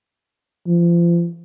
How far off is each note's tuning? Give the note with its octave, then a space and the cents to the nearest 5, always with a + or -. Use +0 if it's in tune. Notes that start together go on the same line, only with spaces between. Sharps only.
F3 -30